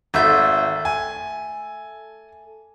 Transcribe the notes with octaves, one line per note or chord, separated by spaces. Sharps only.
G#1 A3 A4 E5 G6
G#5